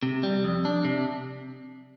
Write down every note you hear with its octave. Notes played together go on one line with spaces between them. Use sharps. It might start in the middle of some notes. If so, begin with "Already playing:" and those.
C3
G3
F2
D4
C3